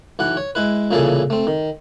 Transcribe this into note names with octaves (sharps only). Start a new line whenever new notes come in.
B1 E3 F#5
C#5
G#3 E4 B4
C2 A#2 C#3 E3 G#4 A4
A3 C4
D#3